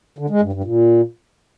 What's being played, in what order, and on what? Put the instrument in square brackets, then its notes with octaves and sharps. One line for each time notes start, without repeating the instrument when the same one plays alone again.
[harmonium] D3
G#3
G2
G2
A#2